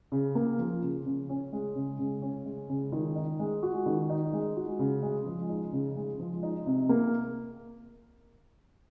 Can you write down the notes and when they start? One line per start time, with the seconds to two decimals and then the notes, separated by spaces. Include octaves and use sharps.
0.12 C#3
0.35 A#3
0.59 F3
0.82 C#3
1.06 C#3
1.29 C#4
1.53 G#3
1.75 C#3
1.99 C#3
2.22 C#4
2.46 G#3
2.69 C#3
2.92 D#3
3.16 D#4
3.39 G#3
3.63 F#4
3.86 D#3
4.10 D#4
4.33 G#3
4.56 F#4
4.79 C#3
5.03 G#3
5.26 F3
5.49 D#4
5.73 C#3
5.97 G#3
6.19 F3
6.43 D#4
6.66 C3
6.89 A#3